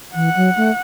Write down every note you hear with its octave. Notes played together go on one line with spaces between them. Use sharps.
E3 F#5
F#3
A3